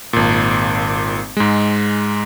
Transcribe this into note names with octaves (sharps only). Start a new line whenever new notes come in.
G#1 A#2
G#2 G#3